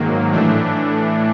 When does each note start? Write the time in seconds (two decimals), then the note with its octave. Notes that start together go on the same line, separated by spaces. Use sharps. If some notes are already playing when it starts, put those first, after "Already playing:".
Already playing: G#2 D#3 F#3 A#3
0.32 A2 E3 A3 D4